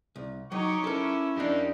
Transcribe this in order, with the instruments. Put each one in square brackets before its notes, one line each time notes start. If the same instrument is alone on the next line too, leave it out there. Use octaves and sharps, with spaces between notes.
[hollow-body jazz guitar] C2
[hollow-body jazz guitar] F#3 [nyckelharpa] D#4 C#5 [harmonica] G5 C#6 D6
[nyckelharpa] C#4 E4 [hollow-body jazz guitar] A4 A#4
[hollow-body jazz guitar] F2 D4 [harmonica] A#3 D#4 G4